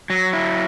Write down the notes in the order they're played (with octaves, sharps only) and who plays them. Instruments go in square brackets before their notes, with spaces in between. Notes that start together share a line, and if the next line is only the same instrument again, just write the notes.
[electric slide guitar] F#3
E4